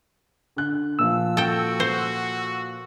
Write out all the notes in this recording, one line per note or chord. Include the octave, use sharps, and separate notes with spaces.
D3 F#6
A#2 F3 E6
F#4 A4 G5
C5